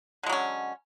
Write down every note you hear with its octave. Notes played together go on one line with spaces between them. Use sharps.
D3 F#3 G#3 C#4